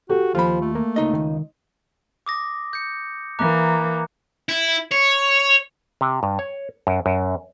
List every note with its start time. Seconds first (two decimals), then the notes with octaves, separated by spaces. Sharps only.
0.09 F#4 G4 A4
0.35 D#2 F3 F4 B5
0.61 A3
0.75 A#3
0.96 C#2 D#4 D#5
1.14 D#3
2.26 D6 D#6 A#6
2.73 G6 C#7
3.39 E3 A#3 A#5 D6 F#6
4.49 E4
4.92 C#5
6.01 C3
6.23 G2
6.39 C#5
6.87 F#2
7.06 F#2